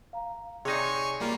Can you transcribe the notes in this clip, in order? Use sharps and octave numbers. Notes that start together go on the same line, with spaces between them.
F5 A#5
C3 D#4 G#4 C#5 D5 G#5 C#6 C7
G3 A#3 F4